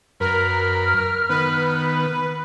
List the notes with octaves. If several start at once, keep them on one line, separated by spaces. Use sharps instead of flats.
F#2 A#4 B4 F6
D#3 B3 B4